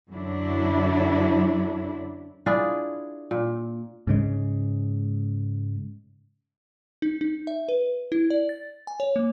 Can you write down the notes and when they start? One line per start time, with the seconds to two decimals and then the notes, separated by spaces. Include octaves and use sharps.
0.11 F#2 D3 F#3 D4 E4
2.46 D4 E4 F4 G#4
3.31 A#2
4.07 G#2 C#3 G#3
7.02 D#4
7.21 D#4
7.47 E5
7.69 B4
8.12 E4
8.30 D5
8.49 A6
8.87 G#5
9.00 C#5
9.16 A#3